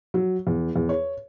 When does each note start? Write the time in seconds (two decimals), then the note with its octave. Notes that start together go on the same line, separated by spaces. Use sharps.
0.14 F#3
0.47 E2
0.76 E2
0.89 C#5